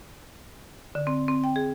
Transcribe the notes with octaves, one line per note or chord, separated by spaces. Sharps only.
D3
C4
C4
G5
G#4